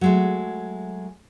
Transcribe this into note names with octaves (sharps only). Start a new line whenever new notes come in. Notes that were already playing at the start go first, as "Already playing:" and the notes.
F#3 G#3 A3